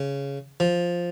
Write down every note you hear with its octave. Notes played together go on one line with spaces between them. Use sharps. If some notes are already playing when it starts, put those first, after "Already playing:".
Already playing: C#3
F3